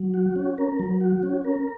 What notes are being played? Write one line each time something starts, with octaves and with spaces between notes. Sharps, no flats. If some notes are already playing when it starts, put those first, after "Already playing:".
Already playing: F#3
F#4
C#4
A#4
F#3
F#4
C#4
A#4